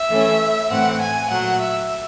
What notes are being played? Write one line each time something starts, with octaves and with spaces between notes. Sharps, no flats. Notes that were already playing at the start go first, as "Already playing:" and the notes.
Already playing: E5
E3 A3 C#4
A2 E3 A3 C4 F#5
G#5
A#2 F#3 A3 F#5
E5